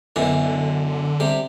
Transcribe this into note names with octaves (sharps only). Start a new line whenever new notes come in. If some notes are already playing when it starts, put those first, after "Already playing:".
F#2 B2 D3 E3
C3 G3